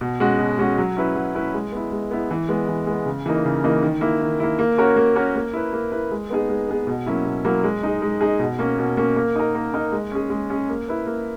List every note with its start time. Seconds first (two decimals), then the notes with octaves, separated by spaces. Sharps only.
0.01 B2
0.20 G#3 C#4 F#4
0.39 B2
0.59 G#3 C#4 F#4
0.78 F#3
0.97 C#4 E4 B4
1.15 F#3
1.35 C#4 E4 B4
1.54 G#3
1.72 B3 E4
1.92 G#3
2.11 B3 E4
2.31 E3
2.49 G#3 B3
2.68 E3
2.87 G#3 B3
3.06 C#3
3.26 E3 A#3 D#4
3.45 C#3
3.64 E3 A#3 D#4
3.83 D#3
4.01 A#3 E4
4.21 D#3
4.40 A#3 E4
4.59 A#3
4.78 C#4 F#4 A#4 C#5
4.96 A#3
5.15 C#4 F#4 A#4 C#5
5.36 A#3
5.53 E4 B4
5.73 A#3
5.92 E4 B4
6.11 G#3
6.30 B3 D#4 G#4
6.49 G#3
6.69 B3 D#4 G#4
6.87 B2
7.06 F#3 A#3 C#4 E4
7.26 B2
7.45 F#3 A#3 C#4 E4
7.64 G#3
7.83 D#4 G#4
8.02 G#3
8.21 D#4 G#4
8.39 B2
8.59 A#3 C#4
8.79 B2
8.97 A#3 C#4
9.16 A#3
9.36 D#4 A#4
9.55 A#3
9.74 D#4 A#4
9.92 G#3
10.12 C#4 G#4
10.30 G#3
10.50 C#4 G#4
10.69 A#3
10.88 E4 B4
11.06 A#3